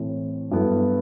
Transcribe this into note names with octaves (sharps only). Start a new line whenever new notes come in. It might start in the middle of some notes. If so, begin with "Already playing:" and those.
Already playing: A2 E3 A3 C4
G2 F#3 B3 E4 A4